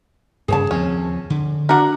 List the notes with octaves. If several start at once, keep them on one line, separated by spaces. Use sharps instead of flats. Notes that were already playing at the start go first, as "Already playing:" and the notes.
G2 C#3 G#4 C#5 A5
D#2 F3 C4 C#4
D3
D4 F#4 A#4 E5 F#5